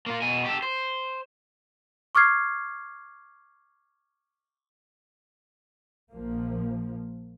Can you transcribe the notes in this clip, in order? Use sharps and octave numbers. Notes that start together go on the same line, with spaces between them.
A#3 F4
B2 G#5
G4 A4
C5
C#6 D6 F6 G#6 C7
A#1 F3 A#3